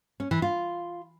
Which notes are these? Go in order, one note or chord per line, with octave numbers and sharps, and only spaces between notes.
C#4
E3
F4